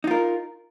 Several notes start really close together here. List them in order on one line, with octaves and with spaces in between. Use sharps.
D#4 F4 A#4